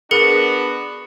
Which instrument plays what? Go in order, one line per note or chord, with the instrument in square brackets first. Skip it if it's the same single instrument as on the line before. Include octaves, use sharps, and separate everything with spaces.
[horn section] B3 D4 F#4 [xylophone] G#4 A#4 [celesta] C#7